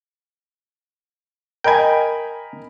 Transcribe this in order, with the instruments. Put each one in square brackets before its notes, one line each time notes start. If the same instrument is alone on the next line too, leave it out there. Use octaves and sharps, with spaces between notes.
[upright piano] A#4 D#5 B5 [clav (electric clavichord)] G5 G#5